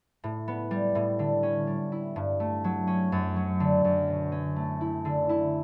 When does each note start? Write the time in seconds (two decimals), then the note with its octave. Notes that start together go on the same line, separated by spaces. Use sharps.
0.24 A2
0.48 B3
0.71 G3
0.95 A2
1.19 D3
1.43 C#4
1.67 G3
1.92 E4
2.16 G2
2.40 A3
2.64 F#3
2.87 C#4
3.12 F#2
3.36 F#3
3.60 D3
3.84 F#2
4.08 B2
4.32 C#4
4.56 A3
4.81 E4
5.05 D3
5.29 E4